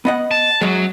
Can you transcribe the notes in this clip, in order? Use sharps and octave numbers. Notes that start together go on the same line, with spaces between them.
B3 D#5 F#5
A5
F#2 F#3 G#3